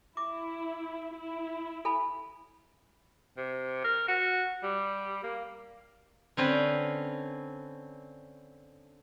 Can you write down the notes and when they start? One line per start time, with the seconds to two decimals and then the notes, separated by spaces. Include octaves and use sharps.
0.17 E4 D6
1.17 E4
1.85 A4 G#5 B5
3.37 C3
3.84 A#4
4.08 F#4
4.63 G3
5.23 A#3
6.37 D3 C4 C#4 B4